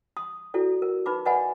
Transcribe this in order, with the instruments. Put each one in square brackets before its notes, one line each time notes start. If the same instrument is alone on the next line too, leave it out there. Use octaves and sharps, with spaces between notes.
[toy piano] C6 D#6
E4 F#4 A4 D5
A#4
D#4 B4 B5 D6
B4 D5 D#5 F#5 G#5 B5